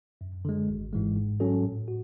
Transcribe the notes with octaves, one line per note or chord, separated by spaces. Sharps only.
F#2
D3 G#3
G#1
G#2 E3 G#3
G#2
F#3 C#4 F#4 A4
A2
F#4